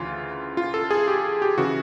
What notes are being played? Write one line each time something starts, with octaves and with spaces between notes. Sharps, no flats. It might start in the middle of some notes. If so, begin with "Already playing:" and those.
Already playing: D2 C#3 E3 F4
F4
A4
G#4
G4
G4
C#3 E3 F#4